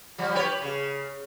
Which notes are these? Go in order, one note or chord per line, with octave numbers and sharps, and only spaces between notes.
F3 G3
G4 B4 C#5
C#3